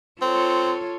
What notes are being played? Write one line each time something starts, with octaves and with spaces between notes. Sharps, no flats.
C4 F4 A4 C#5